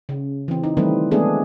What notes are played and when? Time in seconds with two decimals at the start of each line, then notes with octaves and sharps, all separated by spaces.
0.09 C#3
0.48 E3 C4
0.64 D#4
0.77 D#3 E3 G3 A3 C4 B4
1.11 G#3 A3 B3 C4 D4 G#4